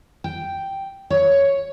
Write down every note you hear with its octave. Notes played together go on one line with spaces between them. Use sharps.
G5
C#5